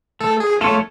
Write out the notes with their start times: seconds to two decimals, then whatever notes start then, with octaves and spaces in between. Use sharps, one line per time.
0.20 A3 A4
0.40 G#4
0.61 A3 F4 A4 C#5